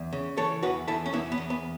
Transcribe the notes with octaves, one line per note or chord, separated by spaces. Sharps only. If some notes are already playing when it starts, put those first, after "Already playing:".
Already playing: E2
C#3
E3 A4 C#5
E2 F#4 B4
E2 E4 A4
C#4
E2 B3 E4
B3
E2
B3